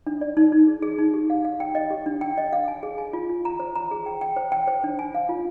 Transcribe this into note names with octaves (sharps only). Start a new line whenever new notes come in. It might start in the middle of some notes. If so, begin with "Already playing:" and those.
D4
D5
D#4
D#4
G#4
G#4
D#4
G4
F5
F5
G5
D#5
G4
D4
G5
D#5
F5
G#5
G#4
G#5
F4
F4
A#5
C5
A#5
G#4
G5
G5
C5
G5
C5
D4
G#5
F5
F4